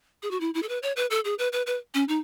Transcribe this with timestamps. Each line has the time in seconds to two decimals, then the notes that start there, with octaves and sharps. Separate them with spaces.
0.23 G#4
0.31 F#4
0.40 E4
0.54 E4
0.62 A4
0.69 B4
0.83 C#5
0.96 B4
1.10 A4
1.25 G#4
1.39 B4
1.53 B4
1.66 B4
1.94 C#4
2.08 D#4